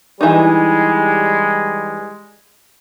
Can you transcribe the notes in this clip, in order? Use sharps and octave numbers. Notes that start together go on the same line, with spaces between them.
E3 G3 G#3 D#4